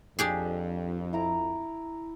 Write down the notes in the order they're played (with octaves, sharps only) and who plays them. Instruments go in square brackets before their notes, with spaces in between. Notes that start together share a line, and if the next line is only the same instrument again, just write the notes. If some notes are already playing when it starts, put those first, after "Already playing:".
[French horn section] F2 [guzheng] D4 G4 G#4
[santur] E4 A#5 D6